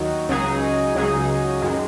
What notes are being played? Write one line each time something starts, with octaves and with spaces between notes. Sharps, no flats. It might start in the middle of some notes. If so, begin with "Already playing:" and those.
Already playing: D#2 D#3 F#3
C#2 C#3 F#3 D#4 G#4
C#2 C#3 F#3 D#4 G#4
F#2 D#3 G#3